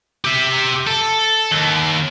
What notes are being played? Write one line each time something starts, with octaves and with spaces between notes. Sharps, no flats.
G4 E5
A4
D#2